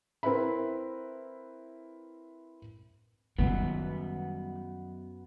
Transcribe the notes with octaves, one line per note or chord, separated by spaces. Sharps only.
C4 E4 A#4 B4 E5 B5
F#2 D#3 G3 B3